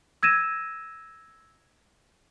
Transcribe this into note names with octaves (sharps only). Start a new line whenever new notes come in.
E6 G#6 A#6 D#7 E7